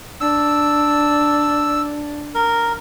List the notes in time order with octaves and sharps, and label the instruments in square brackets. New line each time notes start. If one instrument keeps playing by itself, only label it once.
[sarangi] D4 [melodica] E6
[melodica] A#4